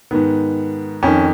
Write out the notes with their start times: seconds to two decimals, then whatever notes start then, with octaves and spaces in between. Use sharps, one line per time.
0.11 G#2 D#3 B3
1.03 F2 D#3 C#4